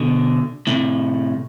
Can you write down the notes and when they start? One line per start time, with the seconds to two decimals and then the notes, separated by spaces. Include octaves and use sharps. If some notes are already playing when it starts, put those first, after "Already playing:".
Already playing: B2 D3
0.67 A2 C3